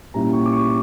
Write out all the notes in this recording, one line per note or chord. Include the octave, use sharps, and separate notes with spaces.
A#2 G3 C#4 E4 A#5
C#6
D6
C#6